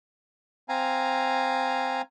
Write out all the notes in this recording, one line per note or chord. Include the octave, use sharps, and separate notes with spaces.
C4 F5 G#5 A#5